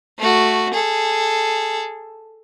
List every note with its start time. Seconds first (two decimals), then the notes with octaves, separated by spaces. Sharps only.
0.19 A3 F#4
0.74 G#4 A4